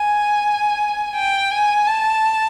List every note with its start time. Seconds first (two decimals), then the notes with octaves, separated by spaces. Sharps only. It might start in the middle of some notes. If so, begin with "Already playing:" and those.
Already playing: G#5
1.15 G5
1.51 G#5
1.86 A5